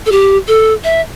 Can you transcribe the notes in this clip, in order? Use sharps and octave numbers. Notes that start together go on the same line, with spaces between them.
A4
G4
A4
E5